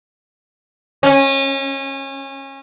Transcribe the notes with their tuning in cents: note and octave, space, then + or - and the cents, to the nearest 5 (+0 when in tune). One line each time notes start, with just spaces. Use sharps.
C#4 -25